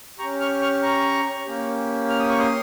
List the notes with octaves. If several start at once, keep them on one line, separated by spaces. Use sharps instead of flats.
C#4 G4 A#5 C#6
C#6 F6
C#6 F6
A#5 C#6
A#3 C#4 G4
F6
D#6
C#6
C6 D#6